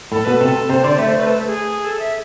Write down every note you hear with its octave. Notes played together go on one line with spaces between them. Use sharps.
A2 A4
B2 B4
C3 A4
C3 C5
D3 D5
A3 E5
C5
B4
A4
G#4
A4
E5